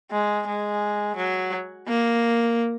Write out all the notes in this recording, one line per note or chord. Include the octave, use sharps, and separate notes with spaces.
G#3
G#3
F#3
A#3